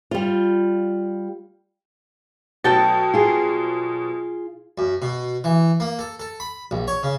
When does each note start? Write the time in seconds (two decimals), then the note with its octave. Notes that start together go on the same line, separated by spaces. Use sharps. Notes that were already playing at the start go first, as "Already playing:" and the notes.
0.11 G3 F4
2.64 B2 F#3 A4 G5 A5
3.14 F4 G#4
4.78 F#2
5.02 B2
5.44 E3
5.80 A#3
5.99 A4
6.20 A4
6.40 B5
6.71 A#1
6.88 C#5
7.03 C#3